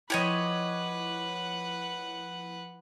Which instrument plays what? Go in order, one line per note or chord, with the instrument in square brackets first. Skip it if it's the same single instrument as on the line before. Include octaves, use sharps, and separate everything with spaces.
[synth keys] F3 E4 [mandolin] G4 C#5 D#5 [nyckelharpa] B4 F#5